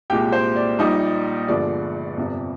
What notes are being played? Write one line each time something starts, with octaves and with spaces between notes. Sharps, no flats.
C2 A#2 G#3 G4 G5
C5
D5
A#1 A#2 G3 D#4 D#5
G1 G2 D3 F3 G#3 D5
G1 F2 C3